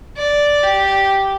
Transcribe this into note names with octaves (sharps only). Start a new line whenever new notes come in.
D5
G4